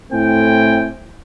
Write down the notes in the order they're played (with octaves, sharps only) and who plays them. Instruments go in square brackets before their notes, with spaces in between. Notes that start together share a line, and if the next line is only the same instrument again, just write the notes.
[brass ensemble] A2 A3 C4 E4 G5 G#5